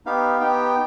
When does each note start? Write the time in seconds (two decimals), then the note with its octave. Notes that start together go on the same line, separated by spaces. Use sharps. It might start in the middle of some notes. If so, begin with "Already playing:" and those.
0.06 B3 D#4 G4 F5
0.40 B3 D#4 G4 G5